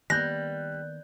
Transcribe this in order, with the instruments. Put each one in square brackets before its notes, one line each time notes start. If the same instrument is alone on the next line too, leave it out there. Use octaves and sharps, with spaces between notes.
[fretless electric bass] D#3 A#3 B3 [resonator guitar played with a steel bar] G3 [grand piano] F#6 G6 [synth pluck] A#6